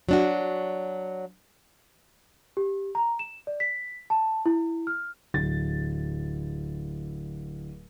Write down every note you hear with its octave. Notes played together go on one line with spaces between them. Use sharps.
F#3 D4 F#4
G4
A#5
E7
D5
B6
A5
E4
F6
D1 A6